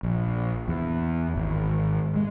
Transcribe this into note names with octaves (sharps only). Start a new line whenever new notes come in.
A#1
E2
G#1
G#3